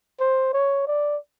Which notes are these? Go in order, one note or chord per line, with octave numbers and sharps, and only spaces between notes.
C5
C#5
D5